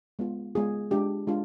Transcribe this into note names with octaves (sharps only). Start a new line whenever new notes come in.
G#3 B3 F4
G#3 B3 F4 G#4
G#3 D4 F4 G4
G#3 D4 F4